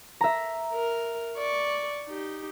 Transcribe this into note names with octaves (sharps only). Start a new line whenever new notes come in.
E5 A#5
A#4
D5 C#6
D#4 G4